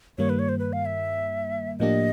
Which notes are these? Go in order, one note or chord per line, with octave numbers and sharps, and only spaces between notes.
G2 D#3 G3 A#3 C#5
B4
C#5
C5
B4
F5
E5
A2 F3 A#3 D4 G4 D#5